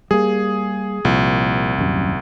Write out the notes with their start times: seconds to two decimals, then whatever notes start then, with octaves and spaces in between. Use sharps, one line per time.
0.11 G3 A#3 G#4
1.05 C2 A#2 F3
1.78 D#1 F#2